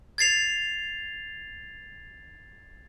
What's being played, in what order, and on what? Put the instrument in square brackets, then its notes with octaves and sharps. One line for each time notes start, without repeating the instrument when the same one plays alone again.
[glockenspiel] G#6 A6 C7 F7